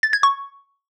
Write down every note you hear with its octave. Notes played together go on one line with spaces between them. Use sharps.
A6
G#6
C#6